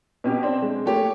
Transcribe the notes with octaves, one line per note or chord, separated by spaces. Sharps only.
B2 C#4 G4
C4 D4
G#3
A3 A#3 G4 C#5